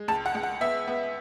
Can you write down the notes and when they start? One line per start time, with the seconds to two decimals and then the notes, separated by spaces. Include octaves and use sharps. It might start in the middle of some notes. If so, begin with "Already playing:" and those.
Already playing: G#3
0.08 C#2 A5
0.26 F#5
0.35 C#2
0.43 F#5
0.61 B3 E5
0.87 B3